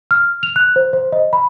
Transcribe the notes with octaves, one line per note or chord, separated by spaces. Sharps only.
F6
F7
F#6
C5
C5
D#5
B5